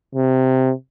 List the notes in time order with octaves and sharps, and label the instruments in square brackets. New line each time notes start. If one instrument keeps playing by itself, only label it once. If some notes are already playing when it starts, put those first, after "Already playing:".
[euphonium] C3